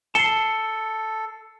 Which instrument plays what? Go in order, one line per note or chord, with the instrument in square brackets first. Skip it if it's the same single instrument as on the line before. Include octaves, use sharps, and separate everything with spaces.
[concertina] A4 [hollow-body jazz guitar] A5 [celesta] C7 G7 [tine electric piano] C#7